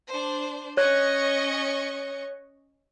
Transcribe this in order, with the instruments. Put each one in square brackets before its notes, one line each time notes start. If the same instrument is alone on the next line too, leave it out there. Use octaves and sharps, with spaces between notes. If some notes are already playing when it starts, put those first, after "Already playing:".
[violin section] D4 C5
[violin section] C#4 D#5 C#6 [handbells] C#5 F#6